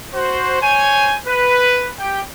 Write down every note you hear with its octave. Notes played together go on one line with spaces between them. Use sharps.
F#4 C5
C5 C#5 G#5
B4
G4 G5